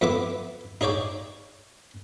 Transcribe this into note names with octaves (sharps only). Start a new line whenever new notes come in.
F2 B3 E4 B4 D6
D#4 G#4 C#5 D5 G5